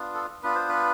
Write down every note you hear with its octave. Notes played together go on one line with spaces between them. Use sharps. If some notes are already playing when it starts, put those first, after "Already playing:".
Already playing: B3 D4 F4
A4
B3 D4 F4 B4
C5
B4